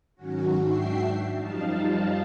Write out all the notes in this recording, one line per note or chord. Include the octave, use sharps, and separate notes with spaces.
G#2 D#3 F#3 C#4 F#4
G#2 D4 F#4 E5 G5 C7
F#2 F3 G3 D#4 F5 A5